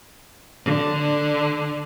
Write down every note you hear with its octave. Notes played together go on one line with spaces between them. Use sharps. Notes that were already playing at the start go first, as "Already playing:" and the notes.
D3